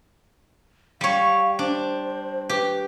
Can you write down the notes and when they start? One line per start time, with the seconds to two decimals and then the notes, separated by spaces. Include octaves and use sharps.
1.01 G3 C#5 F5
1.59 D4 C5
2.49 G4 B4